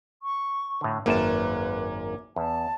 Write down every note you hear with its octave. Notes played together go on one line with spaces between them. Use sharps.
C#6
A2 D3
G#1 F#2 A#3 B4 A5
E2 A5